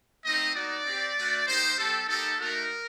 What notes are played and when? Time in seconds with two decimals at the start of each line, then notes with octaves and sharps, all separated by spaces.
0.25 A3 C4 D#4 D#5
0.55 A#3 D#4 F#4 D5
0.85 C4 G4
1.17 A3 D4 F#4
1.47 A#3 D#4 G4 C5
1.77 G3 C4 G4 A4
2.08 A#3 D#4 G4 A4
2.39 A3 D#4 F#4 A#4